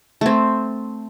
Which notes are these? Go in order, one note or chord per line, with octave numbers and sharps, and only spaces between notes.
A3 C4